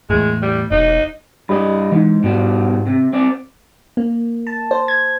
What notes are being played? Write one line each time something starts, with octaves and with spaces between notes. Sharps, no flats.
E2 A2 G#3
G3
E1 D#4
G2 G4 D5 D#5 B5
G#2 E3 D#4
G#2 B2 G3
C3
C4 D5
A#3
A5
C5
G#6